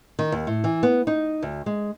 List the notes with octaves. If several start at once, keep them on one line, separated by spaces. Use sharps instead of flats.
D#3
D#2
A2
E3
B3
D#4
D2
G#3